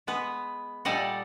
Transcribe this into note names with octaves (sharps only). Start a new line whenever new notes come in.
G#3 B3 B4
A#2 G3 A4 D5 D#5 F#5